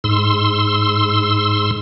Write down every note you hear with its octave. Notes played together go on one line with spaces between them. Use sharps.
G#2 C6 E6